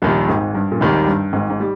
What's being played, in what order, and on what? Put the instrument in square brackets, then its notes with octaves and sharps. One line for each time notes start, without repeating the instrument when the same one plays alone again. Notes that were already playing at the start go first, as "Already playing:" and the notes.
[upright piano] A#1 A#2 [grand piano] D#2 D#3 G3
[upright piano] G#1 G#2
G2
A#2
[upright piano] G#1 G#2 [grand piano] D#2 D#3 G3
[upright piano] G2
G#1 G#2
G#2
[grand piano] G3